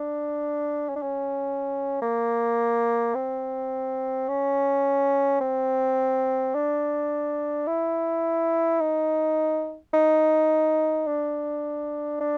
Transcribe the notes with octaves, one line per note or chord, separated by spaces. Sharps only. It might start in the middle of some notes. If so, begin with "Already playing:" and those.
Already playing: D4
C#4
D4
C#4
A#3
C4
C#4
C4
D4
E4
D#4
D#4
D4
D4